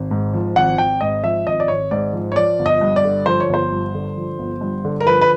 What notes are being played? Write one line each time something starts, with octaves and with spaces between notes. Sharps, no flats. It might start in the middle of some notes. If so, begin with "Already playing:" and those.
Already playing: G#1
G#2
F3
G#1 F#5
G#1 G5
G#2 D#5
F3 E5
G#1 D#5
D5
G#1 C#5
G#2 D5
F3
C#5
F3 D5
G1
D#5
G2
D5
D3
F3 C5
C#5
G1 C5
G2
D3
F3
G1
G2
D3
A#4
F3 B4
B4